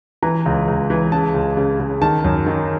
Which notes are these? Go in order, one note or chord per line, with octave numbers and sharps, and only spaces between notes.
E3 A#5
C#2
C#2
E3
C#3 A5
C#2
C#3
C#3
D#3 A5
F#2
D#3